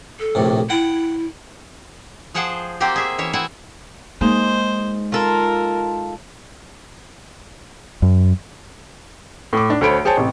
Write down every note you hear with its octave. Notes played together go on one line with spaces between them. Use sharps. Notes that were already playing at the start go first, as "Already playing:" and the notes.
A4
A#1 A2 C3
E4 F#5 G5
F3 G#4 C5 F#5 G5 A5
A#3 C4 F#4 G4 C5
G#4 E5
E3 C#4 C#5 E5
C4 E4 E5 F#5 G#5
G#3 A#3 D#4 C5
F4 A4 A#4
F#2
A2 D6
D4
D2 A3 C5 C#5 B5 D7
G#4 C5 C#5 G5 A5
A1 C3